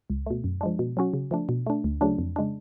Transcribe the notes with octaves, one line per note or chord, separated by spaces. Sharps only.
C#2
B2 A3
F#2
F3 G#3 D4
B2
F#3 C#4 F#4
C#3
F3 A3 D4
B2
A3 D4
D2
C#3 F#3 A3 D4
F2
C#3 G#3 D4